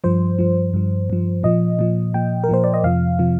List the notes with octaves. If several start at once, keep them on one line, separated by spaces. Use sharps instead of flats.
G2 F3 C5
G2 F3
G2 F3
G2 F3
A#2 F3 D#5
A#2 F3
A#2 F3 G5
A#4
A#2 F3 C5
D5
D#5
F2 C3 F3 F5
C3 F3